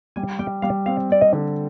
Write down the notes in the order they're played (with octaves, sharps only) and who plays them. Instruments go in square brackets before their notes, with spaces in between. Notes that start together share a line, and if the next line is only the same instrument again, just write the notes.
[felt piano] G3 [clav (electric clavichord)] G#5
[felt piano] G3 [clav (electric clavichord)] G5
[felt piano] G3 [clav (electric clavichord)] F5
[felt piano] C4 [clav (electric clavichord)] F5
[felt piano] C4 [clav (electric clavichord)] D5
[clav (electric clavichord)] D#5
[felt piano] D3